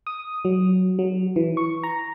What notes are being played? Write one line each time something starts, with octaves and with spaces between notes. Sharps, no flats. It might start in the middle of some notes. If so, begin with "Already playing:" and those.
D#6
F#3
F#3
E3
C#6
A#5